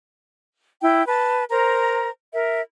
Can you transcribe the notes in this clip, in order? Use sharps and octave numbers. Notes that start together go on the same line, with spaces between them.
E4 G5
B4 A5
A#4 C5 A#5
A#4 E5